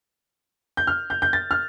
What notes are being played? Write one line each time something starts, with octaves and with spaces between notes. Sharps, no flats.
G6
F6
G6
G6
A6
F6